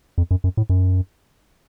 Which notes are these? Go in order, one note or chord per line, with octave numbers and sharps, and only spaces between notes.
F2
F#2
F#2
A2
F#2